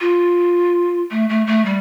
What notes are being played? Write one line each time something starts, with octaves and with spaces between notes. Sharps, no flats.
F4
A3
A3
A3
G3